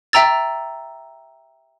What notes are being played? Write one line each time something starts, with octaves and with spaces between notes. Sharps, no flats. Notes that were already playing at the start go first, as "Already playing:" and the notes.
E5 G5 A#5 E6 A6